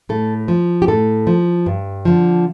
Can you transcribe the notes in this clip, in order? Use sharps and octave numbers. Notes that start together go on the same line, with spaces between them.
A2 A4
F3
G4
A2 A4
F3
G2
D3 F3